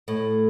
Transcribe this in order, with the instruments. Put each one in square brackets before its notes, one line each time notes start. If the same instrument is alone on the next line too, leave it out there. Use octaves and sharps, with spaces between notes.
[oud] A2